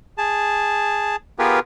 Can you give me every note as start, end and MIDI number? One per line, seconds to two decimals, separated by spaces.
0.18 1.16 68
0.18 1.16 81
1.39 1.59 59
1.39 1.59 65
1.39 1.59 67
1.39 1.59 68
1.39 1.59 70
1.39 1.59 71